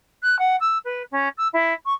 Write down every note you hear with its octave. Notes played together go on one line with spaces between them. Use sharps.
F#6
F#5
E6
B4
C#4
E6
E4
C#6